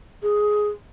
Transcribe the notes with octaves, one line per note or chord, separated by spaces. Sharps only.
G#4